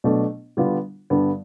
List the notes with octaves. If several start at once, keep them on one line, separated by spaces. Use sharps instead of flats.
B2 F#3 A3 D4
D3 G3 B3 D4 F4
G2 D3 G3 B3